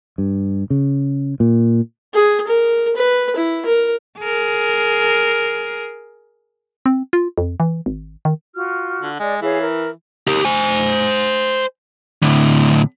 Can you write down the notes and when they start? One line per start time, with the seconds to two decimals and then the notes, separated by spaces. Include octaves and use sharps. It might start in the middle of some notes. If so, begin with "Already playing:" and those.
0.18 G2
0.70 C#3
1.40 A#2
2.14 G#4
2.47 A#4
2.96 B4
3.36 E4
3.66 A#4
4.19 G#4 A#4
6.86 C4
7.13 F4
7.38 F2
7.60 E3
7.86 G#1
8.25 D#3
8.54 F4 F#4 F6
9.02 D3
9.20 G#3 D5
9.42 E3 G#4 C#5 F5
9.63 A#4
10.28 G4 A#4
10.45 C5 G#5
12.23 A2 D3